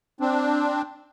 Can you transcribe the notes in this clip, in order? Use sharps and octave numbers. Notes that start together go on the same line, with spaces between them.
C4 D4